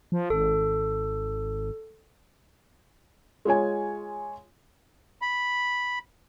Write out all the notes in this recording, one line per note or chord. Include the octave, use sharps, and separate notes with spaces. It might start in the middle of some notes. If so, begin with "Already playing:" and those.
F3
G#1 A4
G#3 F4 C#5 G#5
B5